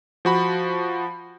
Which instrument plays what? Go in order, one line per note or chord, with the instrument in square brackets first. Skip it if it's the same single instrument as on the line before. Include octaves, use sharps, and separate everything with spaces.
[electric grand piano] F3 F#4 B5